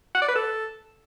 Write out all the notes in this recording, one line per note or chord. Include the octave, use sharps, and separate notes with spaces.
F#5
D5
B4
A4